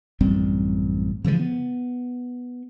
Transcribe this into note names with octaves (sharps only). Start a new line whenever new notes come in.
A1 F#2 G3 C4
C#3 E3 F3 G#3
B3